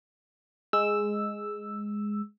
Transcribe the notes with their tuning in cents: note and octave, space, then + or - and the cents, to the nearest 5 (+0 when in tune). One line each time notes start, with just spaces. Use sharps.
G#3 +0 E6 +0